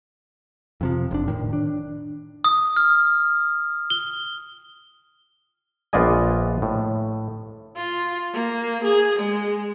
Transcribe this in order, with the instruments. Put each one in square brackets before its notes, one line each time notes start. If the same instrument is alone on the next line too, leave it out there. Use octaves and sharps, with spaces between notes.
[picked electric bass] F2 C3 F3
F1 D4
A2 D#3
D4
[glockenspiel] D#6
F6
G7
[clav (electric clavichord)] A#1 B3 F4 D5 D#5 G#5
A2
[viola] F4
A#3
G#4
G#3